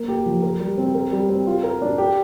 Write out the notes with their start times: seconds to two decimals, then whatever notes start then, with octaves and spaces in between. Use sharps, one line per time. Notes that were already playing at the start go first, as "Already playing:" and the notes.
Already playing: A#3
0.08 G4
0.26 F3
0.42 A#4
0.60 G3
0.78 C4
0.95 A#4
1.12 G3
1.29 C4
1.47 F4
1.64 A#4
1.82 D4
1.98 G4